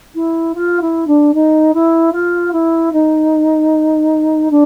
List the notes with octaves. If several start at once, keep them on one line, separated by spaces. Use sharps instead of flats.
E4
F4
E4
D4
D#4
E4
F4
E4
D#4
D4